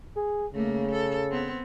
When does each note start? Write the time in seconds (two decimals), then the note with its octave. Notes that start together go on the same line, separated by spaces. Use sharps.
0.16 G#4
0.54 C#3 A3 A#3
0.92 A4
1.31 B3 C4